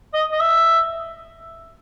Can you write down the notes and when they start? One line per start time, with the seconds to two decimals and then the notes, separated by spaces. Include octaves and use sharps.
0.14 D#5
0.32 D#5
0.40 E5